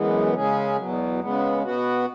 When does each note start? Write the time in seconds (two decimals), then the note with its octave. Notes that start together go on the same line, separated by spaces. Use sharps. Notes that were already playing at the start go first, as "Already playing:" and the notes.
Already playing: F#2 E3 G#3 B3
0.34 C#3 G#3 C#4 G#4
0.77 E2 B2 F#3
1.20 C#3 G#3 B3
1.62 B2 B3 F#4